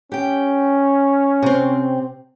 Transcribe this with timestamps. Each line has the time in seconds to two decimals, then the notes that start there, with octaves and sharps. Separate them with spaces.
0.12 C#4 G4 G5
1.42 C3 C4